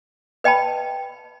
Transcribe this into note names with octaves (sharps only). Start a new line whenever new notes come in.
B4 D#5 G5 A5 B5